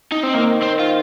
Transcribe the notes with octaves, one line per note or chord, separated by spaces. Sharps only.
D#4
C4
D#3 A#3
C4
F4